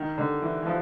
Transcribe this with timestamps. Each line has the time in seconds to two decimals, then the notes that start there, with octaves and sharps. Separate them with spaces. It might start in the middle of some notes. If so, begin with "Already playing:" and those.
Already playing: D#3
0.18 D3
0.42 E3
0.62 E3
0.67 F3